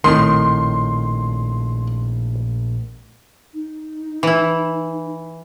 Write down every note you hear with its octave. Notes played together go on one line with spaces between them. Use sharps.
A#1 A2 D#3 A3 C4 D#4 C6
D#4
E3 E4